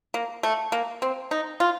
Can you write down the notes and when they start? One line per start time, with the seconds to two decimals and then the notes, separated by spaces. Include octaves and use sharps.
0.14 A#3
0.43 A3
0.72 A#3
1.02 C4
1.31 D#4
1.60 F4